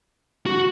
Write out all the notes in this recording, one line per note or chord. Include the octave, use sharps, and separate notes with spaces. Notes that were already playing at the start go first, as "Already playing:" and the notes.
F#4